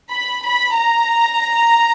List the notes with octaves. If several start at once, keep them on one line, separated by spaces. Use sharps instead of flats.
B5
B5
A#5